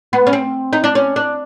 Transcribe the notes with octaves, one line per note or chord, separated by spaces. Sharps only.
B3
C#4
C4
D#4
D4
C#4
D4